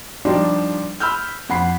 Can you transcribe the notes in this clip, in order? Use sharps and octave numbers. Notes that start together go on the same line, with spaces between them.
F3 G3 D4 D#4 F4 G4
B5 E6 F6 G6
F2 F#5 B5 C7